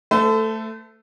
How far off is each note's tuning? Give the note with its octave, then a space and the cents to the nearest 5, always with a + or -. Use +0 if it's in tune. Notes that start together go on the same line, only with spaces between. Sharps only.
A3 +10 A4 +0 C5 -40